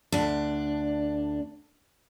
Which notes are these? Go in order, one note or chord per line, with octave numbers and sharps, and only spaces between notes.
D2 D4